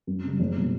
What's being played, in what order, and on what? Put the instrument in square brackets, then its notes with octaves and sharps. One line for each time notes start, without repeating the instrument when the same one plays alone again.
[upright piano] F#2
C#3 G3
F#1
B2 G3